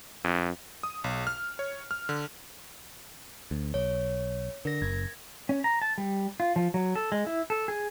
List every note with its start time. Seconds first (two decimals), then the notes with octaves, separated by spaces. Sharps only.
0.24 F2
0.83 D#6
1.04 B1
1.27 F6
1.59 C#5
1.91 F6
2.09 D3
3.51 D2
3.74 B1 C#5
4.65 D3 A#4 A#6
4.82 F#1 G#6
5.49 C#4
5.64 A#5
5.82 A5
5.98 G3
6.40 F4
6.56 F3
6.74 F#3
6.95 A4
7.12 G#3
7.27 E4
7.50 A4
7.68 G#4